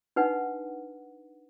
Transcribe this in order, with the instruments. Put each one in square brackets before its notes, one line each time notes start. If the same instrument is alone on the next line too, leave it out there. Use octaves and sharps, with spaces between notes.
[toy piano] D4 D#4 B4 F#5